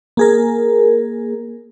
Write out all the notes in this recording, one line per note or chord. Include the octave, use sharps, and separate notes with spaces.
A#3 G#4 A#4